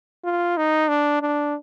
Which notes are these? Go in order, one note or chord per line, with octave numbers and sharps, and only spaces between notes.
F4
D#4
D4
D4